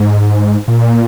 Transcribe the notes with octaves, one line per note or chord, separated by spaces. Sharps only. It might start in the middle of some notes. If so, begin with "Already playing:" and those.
Already playing: G#2
A#2